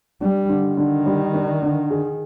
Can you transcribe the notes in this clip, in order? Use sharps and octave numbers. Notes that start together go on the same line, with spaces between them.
G3 D4
D3
D#3
D3
G3
D4
D3
G#4